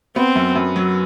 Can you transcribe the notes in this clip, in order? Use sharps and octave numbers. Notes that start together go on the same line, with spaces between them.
B3 C4
F#2
F#2
F#3